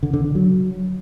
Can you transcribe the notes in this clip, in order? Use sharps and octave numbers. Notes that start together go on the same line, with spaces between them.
D3
D3
D3
F#3